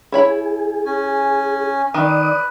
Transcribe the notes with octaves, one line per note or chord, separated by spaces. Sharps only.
E4 G#4 C#5 B5
C#4 G#5
D#3 B4 D5 D#6